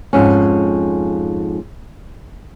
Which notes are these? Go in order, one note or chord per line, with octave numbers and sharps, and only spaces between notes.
F2 G#2 C#4